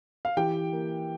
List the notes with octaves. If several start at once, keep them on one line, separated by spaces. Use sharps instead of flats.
F5
E3 G4 G5
A#3